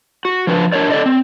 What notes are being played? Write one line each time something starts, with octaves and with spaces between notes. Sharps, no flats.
F#4
F3 D4 B4
D4 A#4 C#5 D5
D4 A4 D5 D#5
C4